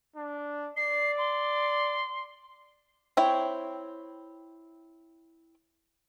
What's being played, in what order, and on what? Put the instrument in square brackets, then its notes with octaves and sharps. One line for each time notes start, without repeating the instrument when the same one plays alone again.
[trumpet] D4
[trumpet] D5 [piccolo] C7
[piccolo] C6
[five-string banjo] C4 E4 C#5 G5